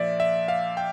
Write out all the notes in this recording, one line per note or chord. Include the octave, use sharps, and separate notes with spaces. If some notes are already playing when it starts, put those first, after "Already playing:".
Already playing: A#2 F3 D5 E5
E5
F5
G5